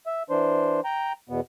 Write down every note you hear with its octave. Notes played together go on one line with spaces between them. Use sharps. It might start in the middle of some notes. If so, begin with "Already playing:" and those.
E5
E3 D4 C5
G5 A#5
E2 B2 B3